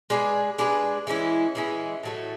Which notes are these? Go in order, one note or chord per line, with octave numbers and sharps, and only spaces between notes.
G#3 D4 G#4 B4
G#3 D4 G#4 B4
E3 G#3 C#4 E4
E3 G#3 C#4 E4
A2 F#3 A3